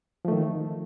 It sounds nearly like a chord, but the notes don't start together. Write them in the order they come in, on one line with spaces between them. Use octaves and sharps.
F3 A3 D#3